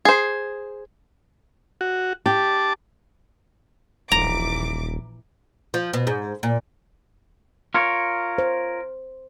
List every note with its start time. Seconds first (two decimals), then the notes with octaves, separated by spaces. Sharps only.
0.05 G#4 C5
1.81 F#4
2.26 G4 A5 D6
4.12 D#1 A#1 E3 A#5 D6
5.74 F3
5.93 B2
6.07 G#2
6.43 A#2
7.74 F4 A#4 C#5
8.38 C5